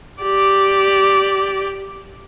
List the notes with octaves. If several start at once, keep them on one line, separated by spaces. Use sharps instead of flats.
G4 D5